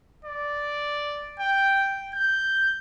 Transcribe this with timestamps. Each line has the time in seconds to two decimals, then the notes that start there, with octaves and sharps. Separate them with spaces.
0.25 D5
1.39 G5
2.14 G6